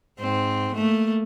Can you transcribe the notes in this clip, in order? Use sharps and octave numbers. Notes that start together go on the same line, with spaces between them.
G#2 C4
A3 A#3